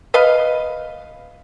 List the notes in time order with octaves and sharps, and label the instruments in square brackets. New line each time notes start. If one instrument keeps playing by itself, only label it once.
[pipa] B4 D#5 F5